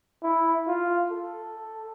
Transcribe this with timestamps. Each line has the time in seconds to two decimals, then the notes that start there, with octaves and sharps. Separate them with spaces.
0.23 E4
0.68 F4
1.11 A4